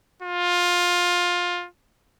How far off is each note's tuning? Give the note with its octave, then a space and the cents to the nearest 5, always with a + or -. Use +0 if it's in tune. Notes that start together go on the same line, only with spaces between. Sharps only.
F4 +15